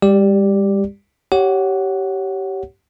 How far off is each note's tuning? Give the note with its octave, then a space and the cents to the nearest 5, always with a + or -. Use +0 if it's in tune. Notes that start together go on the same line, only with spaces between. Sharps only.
G3 +40 G4 +0 D5 +0
G4 -20 C#5 +0 F#5 +0